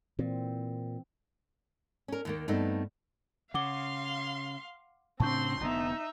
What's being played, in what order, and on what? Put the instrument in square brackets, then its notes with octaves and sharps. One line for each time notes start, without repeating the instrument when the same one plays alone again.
[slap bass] A#2 [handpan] E3 C4
[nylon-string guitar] C#4 A#4
D#2 D#3 A#3
G2 A3 B3 C4 D#4
[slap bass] C#3 [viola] F5 C6 [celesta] F#5 D6 G7
[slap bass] A2 C#3 D4 [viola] C4 C6 [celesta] A5 C#6 G6
[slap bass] F1 D3 B3 [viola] D#4 E5